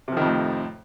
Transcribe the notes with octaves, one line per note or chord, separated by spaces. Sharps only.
F2 A2 C3 D#3 F3